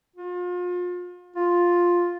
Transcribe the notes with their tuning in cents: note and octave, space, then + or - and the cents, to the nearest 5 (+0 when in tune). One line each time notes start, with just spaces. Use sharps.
F4 +35
F4 +5